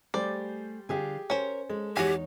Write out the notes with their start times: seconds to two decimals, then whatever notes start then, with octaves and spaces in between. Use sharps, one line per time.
0.14 G3 A3 G4 G#4 C5 D5
0.89 D3 G3 F4 G4 G#4 G#5
1.30 C#4 A#4 C5 C#5
1.69 G#3 A4
1.97 E2 D#4 F#4 G4 C#5 G#5